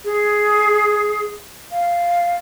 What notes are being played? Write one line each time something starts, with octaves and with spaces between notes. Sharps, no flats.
G#4
F5